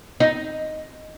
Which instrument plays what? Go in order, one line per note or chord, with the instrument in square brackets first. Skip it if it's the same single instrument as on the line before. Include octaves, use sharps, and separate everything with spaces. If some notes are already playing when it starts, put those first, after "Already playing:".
[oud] D#4